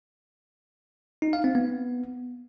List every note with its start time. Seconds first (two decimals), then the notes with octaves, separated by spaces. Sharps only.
1.22 D#4
1.33 F5
1.44 C4
1.55 B3